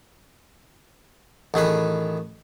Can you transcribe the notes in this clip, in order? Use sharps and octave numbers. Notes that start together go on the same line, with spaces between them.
A1 D#3 G#4 B4